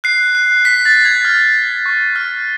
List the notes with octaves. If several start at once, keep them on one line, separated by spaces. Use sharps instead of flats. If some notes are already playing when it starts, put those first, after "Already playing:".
F#6 C7
F#6
F#6 B6
A6
F#6
G#6
F6
F6
C#6
F6